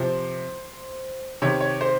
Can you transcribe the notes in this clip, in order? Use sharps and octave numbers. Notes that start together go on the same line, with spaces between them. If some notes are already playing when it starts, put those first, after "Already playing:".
Already playing: C3 F3 C5
C3 D#3 C#5
C#5
C5